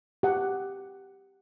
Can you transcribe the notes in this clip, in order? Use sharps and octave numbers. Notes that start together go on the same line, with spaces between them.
G4 F#5